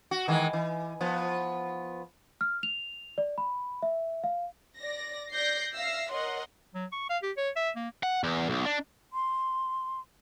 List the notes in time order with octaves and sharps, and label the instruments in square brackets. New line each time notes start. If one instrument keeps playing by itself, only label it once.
[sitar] F#4
D#3 E3 G#3
E3
F3 B3
[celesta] F6
F7
D5
B5
E5
F5
[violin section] D5 A#6
D5 G6 A#6 C7
E5 F5 E6 A#6 C7
A#4 C#5 D#5 F#5 C6
[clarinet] F#3
C#6
F5
G4
C#5
E5
A#3
[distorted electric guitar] F#5
E2
B1
D4
[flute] C6